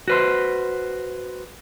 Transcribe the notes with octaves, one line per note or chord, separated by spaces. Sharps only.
F#4 B4 C5